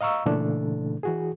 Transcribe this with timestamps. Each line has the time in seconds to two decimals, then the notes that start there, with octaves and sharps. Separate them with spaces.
0.01 D#5 F5 A#5 C#6 E6
0.26 A#2 C#3 E3 A3 D4 A4
1.03 E3 F#4 G#4